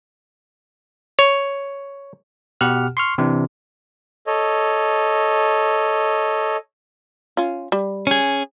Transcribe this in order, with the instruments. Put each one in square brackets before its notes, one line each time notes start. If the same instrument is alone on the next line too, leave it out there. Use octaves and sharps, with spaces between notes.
[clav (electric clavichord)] C#5
[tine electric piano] B2 G4 F#5 F6
C6 C#6 F6
C3 E3 D4
[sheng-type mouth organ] A4 C#5 D#5
[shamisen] C#4 F4
G3
[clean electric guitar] C#4 G#4